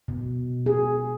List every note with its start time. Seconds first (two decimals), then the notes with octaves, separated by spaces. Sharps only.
0.08 B2
0.66 G#4